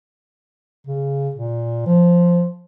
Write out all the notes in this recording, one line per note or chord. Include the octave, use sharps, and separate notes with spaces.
C#3
A#2
F3